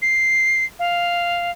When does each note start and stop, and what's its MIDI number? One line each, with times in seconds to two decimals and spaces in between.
0.02 0.65 96
0.79 1.51 77